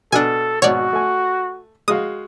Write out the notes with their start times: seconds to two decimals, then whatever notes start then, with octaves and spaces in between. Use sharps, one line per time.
0.12 B2 D4 A4 G#5
0.62 G#1 B2 F#4 C#5 D5
0.93 A3 G#5
1.88 G#3 F#4 F5 D#6